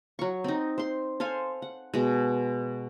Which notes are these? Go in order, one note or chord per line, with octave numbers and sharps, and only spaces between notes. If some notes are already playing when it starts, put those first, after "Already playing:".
F#3 C#6
C4 D#4
C5 C6
A4 C5 F5 G#5
F#5
B2 G#3